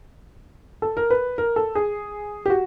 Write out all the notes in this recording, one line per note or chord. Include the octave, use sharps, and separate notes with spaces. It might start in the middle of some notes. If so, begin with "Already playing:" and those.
A4
A#4
B4
A#4
A4
G#4
G4
F#4